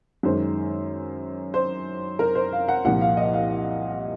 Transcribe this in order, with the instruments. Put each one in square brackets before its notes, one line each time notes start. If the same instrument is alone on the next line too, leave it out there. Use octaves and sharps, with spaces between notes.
[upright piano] F#2 D#3 G#3 C5
C5
A#4
C5
F5
F#5
C2 A#2 F3 F#5
F5
D#5
F5